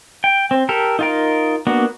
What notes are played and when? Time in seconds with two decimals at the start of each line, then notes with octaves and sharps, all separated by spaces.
0.24 G5
0.51 C4
0.69 G4 A4 A#4
0.99 D#4 F4 A#4
1.67 A#3 B3 D4 F#4